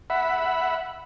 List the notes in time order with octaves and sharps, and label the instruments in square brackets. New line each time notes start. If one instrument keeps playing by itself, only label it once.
[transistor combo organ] E5 F#5 B5